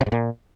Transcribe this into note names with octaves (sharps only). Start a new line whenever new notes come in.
C3
G#2
A#2